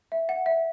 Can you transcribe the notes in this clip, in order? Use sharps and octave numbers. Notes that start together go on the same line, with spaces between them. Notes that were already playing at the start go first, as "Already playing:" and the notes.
E5
F#5
E5